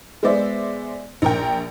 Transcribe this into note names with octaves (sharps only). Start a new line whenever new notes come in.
G#3 B3 C5 D5 E5
A#1 A#4 G5